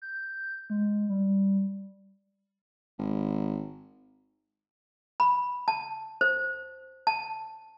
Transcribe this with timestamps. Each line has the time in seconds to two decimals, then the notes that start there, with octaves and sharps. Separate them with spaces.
0.02 G6
0.70 G#3
1.09 G3
2.99 G#1
5.20 B5
5.68 A5
6.21 C5
7.07 A5